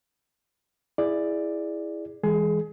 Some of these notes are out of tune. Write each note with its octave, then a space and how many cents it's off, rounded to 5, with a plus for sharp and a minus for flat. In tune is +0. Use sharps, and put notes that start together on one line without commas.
E4 +0 G#4 -5 D5 +10
E3 -15 G#3 -30 G#4 +25